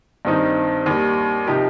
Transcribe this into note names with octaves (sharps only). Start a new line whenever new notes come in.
G2 D#3 C4 D#4
D#2 D#3 G3
C3 F3 D#4 G4